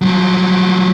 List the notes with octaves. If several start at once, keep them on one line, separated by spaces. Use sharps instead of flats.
F3 F#3